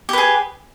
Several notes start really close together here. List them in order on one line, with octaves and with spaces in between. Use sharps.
G4 B4 G#4